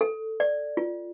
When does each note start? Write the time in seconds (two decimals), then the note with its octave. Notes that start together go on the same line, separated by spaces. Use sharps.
0.01 A4
0.40 D5
0.77 F4